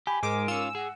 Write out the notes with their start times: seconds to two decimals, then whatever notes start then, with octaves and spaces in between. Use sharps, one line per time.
0.07 G4 G#5 B5
0.23 G#2 G#3 A#4 D6
0.48 C#4 F4 E6
0.75 G#4 F#5